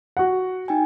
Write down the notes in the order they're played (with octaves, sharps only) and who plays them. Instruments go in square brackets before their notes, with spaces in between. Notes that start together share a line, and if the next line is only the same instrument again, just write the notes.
[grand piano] F#4 F#5
[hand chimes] D#4 G5 G#5